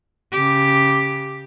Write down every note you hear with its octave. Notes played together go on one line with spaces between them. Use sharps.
C#3 G4